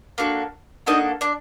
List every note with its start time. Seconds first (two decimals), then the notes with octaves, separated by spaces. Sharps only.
0.18 A#3 D4 F#4 A4
0.86 A#3 D4 D#4 F#4 A4 D#5
1.21 D4 D5